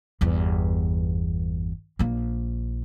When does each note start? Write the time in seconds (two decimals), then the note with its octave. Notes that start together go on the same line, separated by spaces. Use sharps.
0.21 G1 E2
1.99 A#1 A#3